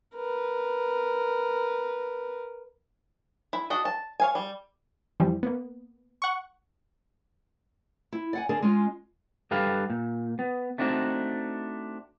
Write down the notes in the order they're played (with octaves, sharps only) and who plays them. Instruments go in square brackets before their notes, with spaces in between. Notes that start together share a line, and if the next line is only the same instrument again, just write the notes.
[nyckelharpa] A#4 B4
[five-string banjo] E4
D4 F#4 D#5
A5
C#5 F5 G#5
G3
[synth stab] F2 E3 F3 G3
A#3 B3
F#5 C#6
[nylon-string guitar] E4
D5 F#5 G#5
D3 D4 G#4 A#4 A5
G#3 C#4 F4
[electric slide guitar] G2 G4 A4 B4 F5
A#2
B3
A3 C4 D4 D#4 F#4